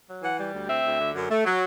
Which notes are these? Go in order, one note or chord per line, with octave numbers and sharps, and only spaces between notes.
F#3
E3 F#5
G3
D2
C4 E5
D2
D3
F#2
A3
F#3